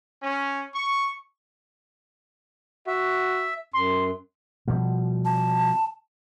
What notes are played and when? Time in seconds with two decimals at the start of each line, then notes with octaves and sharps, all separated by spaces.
0.22 C#4
0.73 C#6
2.87 F#4 E5
3.74 F#2 C6
4.68 B2 F3 G3
5.25 A5